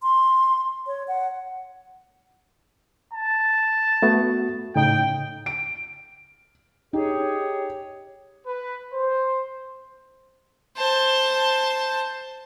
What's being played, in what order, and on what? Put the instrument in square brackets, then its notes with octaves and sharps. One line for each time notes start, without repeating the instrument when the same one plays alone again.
[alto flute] C6
C#5
F#5
[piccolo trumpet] A5
[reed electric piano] A3 B3 F#4
[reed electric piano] A2 C#3 D#4 [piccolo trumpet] G5
[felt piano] D7
[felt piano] D#4 [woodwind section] G4 G#4 C#5
[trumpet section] B4
C5
[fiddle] C5 A5